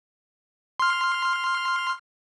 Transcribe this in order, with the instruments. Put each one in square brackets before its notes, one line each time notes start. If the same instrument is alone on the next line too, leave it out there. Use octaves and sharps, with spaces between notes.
[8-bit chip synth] C6 F6